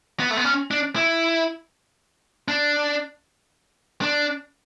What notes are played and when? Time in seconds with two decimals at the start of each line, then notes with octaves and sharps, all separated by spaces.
0.20 B3
0.30 A3
0.37 B3
0.45 C#4
0.71 D4
0.96 E4
2.48 D4
4.02 D4